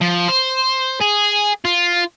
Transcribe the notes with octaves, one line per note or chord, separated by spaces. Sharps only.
F3
C5
G#4
F4